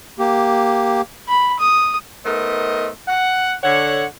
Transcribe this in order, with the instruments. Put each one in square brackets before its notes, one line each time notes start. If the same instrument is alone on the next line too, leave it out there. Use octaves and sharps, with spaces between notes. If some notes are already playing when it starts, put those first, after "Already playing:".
[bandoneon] A#3 G4
[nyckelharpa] B5
D#6
[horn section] A3 B3 D#4 A#4 C5 D#5
F#5
D3 C#5 F#5